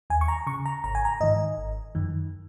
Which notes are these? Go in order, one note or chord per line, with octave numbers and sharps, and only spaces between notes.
D#2 G#5
C#6
A#5
C#3 C#6
A#5
G#1 A#5
G#5
A#5
G#2 D#3 D#5
G#1
F#2 D#3